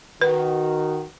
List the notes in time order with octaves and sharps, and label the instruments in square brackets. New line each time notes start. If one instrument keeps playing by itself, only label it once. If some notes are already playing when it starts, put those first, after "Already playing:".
[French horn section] D#3 F#4 [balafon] B4